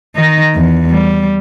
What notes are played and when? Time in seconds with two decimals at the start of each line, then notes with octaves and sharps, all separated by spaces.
0.16 D#3 D#4
0.55 E2
0.90 G3